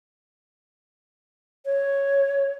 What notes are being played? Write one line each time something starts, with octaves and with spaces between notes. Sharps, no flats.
C#5